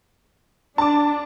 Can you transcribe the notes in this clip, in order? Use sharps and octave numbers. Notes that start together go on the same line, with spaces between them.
D4 A5 D6